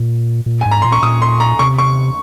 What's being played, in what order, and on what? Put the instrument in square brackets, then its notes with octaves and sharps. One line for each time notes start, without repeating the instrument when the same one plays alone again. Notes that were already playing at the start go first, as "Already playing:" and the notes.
Already playing: [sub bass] A#2
A#2
[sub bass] G#2 [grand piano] G#5
[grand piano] A#5
[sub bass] A#2 [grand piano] C6
[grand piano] C#6
[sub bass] A#2 [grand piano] D#6
[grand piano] C6
A#5
[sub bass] C3 [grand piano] C#6
[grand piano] C#6